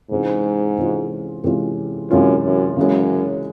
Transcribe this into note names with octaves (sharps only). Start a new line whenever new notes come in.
G#2 C3 E3 G#3 C#4 F4
C3 E3 G#3 C#4 F4
C3 E3 G#3 C#4 F4
F#2 C3 E3 G#3 C#4 F4
F#2
F#2 C#3 E3 G#3